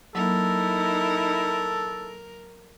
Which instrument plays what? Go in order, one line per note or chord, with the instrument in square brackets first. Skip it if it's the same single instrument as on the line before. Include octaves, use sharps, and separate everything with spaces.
[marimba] F#3 A#3 [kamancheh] D#4 E4 [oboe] A4 [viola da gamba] A#4